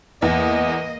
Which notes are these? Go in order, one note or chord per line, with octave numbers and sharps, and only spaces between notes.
E2 A#3 D#5